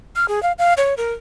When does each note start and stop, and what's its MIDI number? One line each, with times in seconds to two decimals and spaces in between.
0.16 0.26 89
0.28 0.42 68
0.43 0.52 77
0.59 0.74 77
0.77 0.94 73
0.97 1.13 70